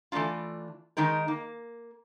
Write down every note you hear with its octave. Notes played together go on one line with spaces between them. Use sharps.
E3 A3 D4 D#4 F4
D#3 G#3 D#4 A#4
A#3